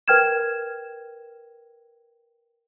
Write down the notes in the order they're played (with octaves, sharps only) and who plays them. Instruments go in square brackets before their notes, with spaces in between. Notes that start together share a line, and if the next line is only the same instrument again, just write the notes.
[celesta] A#4 B4 G5 F6 G#6 E7